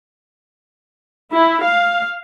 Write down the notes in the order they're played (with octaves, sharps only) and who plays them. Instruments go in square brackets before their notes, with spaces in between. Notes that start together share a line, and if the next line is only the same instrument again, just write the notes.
[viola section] E4
F5